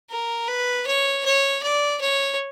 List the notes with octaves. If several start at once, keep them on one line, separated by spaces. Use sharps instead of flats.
A#4
B4
C#5
C#5
D5
C#5